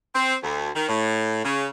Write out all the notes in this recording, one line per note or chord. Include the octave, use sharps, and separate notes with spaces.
C4
D2
D#3
A2
C#3